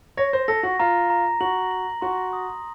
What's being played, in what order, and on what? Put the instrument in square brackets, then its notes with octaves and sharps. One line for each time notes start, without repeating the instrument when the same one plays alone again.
[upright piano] C#5 [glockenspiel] A#6
[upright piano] C5
[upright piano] A4 [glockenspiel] A#6
[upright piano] F#4
[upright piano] F4 [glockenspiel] A#5
[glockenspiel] A#5
[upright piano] F#4 [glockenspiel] F#7
[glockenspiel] F#7
[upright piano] F#4 [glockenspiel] C6
[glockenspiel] D#6